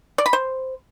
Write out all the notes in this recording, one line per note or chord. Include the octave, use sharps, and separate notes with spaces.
D5
B5
C5